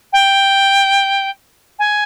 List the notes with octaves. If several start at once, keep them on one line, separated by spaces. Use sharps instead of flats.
G5
G#5